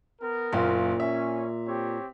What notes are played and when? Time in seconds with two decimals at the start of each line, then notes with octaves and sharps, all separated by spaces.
0.21 B3 A#4
0.53 F#1 A#2 F4
1.00 C#4 E5
1.67 C4 G4 C#5